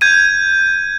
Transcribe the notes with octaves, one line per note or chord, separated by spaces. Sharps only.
G6 G#6 D#7